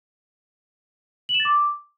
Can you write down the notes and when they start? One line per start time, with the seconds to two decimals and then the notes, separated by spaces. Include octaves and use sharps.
1.29 F#7
1.34 E7
1.40 A6
1.45 D6